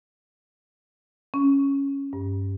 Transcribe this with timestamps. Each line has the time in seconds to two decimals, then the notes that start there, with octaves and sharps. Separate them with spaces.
1.34 C#4
2.13 G2